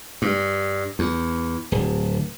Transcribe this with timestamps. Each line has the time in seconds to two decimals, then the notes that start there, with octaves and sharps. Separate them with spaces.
0.22 G2
0.99 E2
1.72 D1